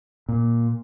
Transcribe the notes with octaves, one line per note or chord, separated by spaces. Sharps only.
A#2